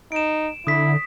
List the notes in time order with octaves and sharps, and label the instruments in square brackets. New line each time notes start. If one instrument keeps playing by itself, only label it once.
[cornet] D#4 [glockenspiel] D7 E7
[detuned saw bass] D3 [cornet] E4 [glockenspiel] D#6 B6